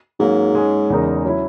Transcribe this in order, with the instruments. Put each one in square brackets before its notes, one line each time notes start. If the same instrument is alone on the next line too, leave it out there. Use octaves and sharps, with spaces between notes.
[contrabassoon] G#2 [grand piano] F#3 A#3 C#4
[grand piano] G#3 C#4 G#4
E2 C#3 G#3 D#4 A#4
F#3 C#4 E4